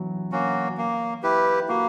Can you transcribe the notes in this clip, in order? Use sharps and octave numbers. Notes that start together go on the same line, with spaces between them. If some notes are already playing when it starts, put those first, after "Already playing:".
Already playing: E3 F#3 B3
A#3 C#4 F#4
A#3
E4 G4 B4
A#3 F#4